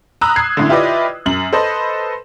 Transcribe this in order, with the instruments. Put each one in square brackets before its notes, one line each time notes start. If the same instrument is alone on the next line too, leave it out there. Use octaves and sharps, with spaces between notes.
[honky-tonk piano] A#5 B5 D#6 E6 F#6
G#6 C7
F#2 A2 D3
E4 F4 G4 B4 D5 D#5
F#2 F#7
A4 B4 C5 D#5